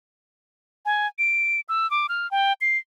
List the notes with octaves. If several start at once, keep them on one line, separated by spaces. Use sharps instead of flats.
G#5
D7
E6
D6
F6
G5
C7